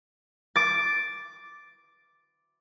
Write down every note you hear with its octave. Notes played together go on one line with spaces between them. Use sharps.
D6 A6